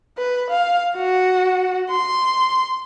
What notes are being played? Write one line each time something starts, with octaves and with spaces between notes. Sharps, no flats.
B4
F5
F#4
C6